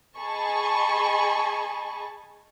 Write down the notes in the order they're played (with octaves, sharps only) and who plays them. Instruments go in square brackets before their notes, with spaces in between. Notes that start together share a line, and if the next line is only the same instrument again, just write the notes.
[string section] G#4 D#5 G#5 A5 B5 C#6